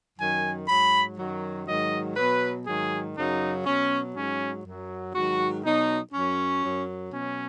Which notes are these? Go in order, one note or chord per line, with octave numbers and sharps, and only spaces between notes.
F#2 D#3 F#3 G#5
G#2 F#3 B5
F#2 D#3 F#3
G#2 D#3 F#3 D#5
B2 F#3 B4
G#2 D#3 F#3 G#4
F#2 C#3 F#3 D#4
B2 F#3 C#4
G#2 F#3 C#4
F#2 F#3
G#2 D#3 F#3 F#4
B2 F#3 D#4
F#2 F#3 C#4
F#2 F#3
B2 F#3 C#4